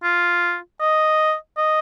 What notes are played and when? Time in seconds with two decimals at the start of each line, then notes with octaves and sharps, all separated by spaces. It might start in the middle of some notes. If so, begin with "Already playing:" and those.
0.04 F4
0.80 D#5
1.58 D#5